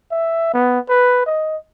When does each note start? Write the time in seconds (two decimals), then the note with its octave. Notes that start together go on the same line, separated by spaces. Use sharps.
0.12 E5
0.53 B3
0.89 B4
1.26 D#5